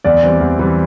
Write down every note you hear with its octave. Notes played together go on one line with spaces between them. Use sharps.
E2 D5
E3 G3 C4
E2
E3 G3 C4